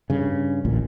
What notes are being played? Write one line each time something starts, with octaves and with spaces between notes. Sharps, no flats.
G2 C#3
A1 D2 A#2